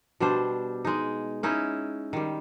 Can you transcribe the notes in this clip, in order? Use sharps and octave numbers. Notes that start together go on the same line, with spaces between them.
B2 G3 D4 C5
G#3 D#4
C#4 D#4 E4 D#5
D#3 G3